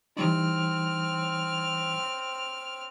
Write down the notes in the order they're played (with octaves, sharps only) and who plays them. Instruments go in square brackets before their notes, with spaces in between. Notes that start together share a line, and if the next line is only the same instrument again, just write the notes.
[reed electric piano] E3 G3 D#4 [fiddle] C4 F6